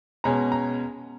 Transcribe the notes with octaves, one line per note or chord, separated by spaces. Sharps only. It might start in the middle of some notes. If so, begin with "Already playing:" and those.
B2 G#3 C#4 A#5
A#5